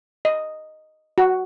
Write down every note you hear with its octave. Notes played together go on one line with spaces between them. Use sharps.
D#5
F#4